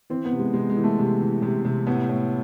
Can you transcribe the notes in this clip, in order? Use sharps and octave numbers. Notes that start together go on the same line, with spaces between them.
E3 C4
B3
C3
G#3
C3 G#3
G#3
E3
A3
C3
E3
C3
C3
A2 B3
A2